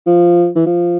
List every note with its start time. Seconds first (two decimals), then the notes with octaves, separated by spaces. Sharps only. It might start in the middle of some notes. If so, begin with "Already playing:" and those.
0.07 F3
0.56 E3
0.66 F3